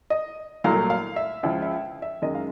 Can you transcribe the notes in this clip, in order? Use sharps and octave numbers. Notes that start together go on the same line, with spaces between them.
D#5
C2 A#2 F#3 A3 F5
F5
E5
C#2 C#3 F3 E5
E5
E5
F#2 D#3 G#3 D#5
F5